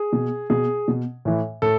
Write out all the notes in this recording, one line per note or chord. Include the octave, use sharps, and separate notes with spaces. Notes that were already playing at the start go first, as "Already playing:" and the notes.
Already playing: G#4
B2
B2 G#4
B2
A2 E3
A2 A4